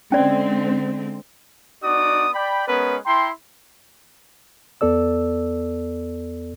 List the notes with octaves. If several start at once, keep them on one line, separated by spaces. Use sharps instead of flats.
D3 G#3 C4 C#4 D5
B3 D4 D#4 F#4 D5 D#6
D5 G5 B5
G#3 B3 C#4 A#4 B4
E4 G5 A#5 C6
E2 B3 A4 D5 E6